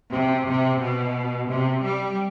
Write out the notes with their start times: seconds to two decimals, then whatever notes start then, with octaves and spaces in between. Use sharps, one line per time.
0.11 C3
0.46 C3
0.80 B2
1.49 C3
1.83 G3